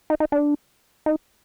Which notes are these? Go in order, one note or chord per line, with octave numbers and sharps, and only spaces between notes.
D#4
D#4
D4
D#4